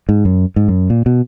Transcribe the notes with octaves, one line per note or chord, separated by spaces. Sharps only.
G#2
F#2
G#2
F#2
A#2
B2